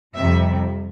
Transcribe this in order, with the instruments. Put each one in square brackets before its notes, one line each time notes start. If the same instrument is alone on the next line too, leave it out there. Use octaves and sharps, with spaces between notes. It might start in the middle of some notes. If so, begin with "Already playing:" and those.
[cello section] F2 C3 G3 E5